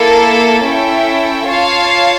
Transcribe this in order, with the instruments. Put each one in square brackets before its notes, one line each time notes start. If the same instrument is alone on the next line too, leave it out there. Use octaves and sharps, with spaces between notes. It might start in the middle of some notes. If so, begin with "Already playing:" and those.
Already playing: [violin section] A#3 E4 A4
C#4 E4 A4 E5 G5
F4 C#5 F5 A5